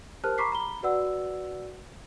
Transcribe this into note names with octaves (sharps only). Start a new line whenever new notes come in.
G4 A#4 C5 A5 F6 F#6
A#5 B5 C#6 D6 B6 C7
A#5 B5 G7
F#4 B4 D5 F#5 E6